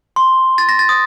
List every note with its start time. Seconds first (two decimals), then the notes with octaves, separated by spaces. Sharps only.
0.16 C6
0.58 A6
0.69 A#6
0.79 A6
0.89 D#6